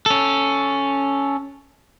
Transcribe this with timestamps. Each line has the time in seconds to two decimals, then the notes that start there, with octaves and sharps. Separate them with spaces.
0.06 C#4 A4